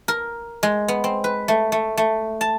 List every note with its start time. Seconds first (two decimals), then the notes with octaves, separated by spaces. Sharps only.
0.08 A#4
0.63 G#3
0.88 B3
1.04 C4
1.24 B4
1.48 A3
1.72 A3
1.97 A3
2.41 A5